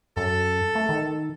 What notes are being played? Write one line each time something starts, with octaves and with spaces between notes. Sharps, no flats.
F#2 A4
A3
D#3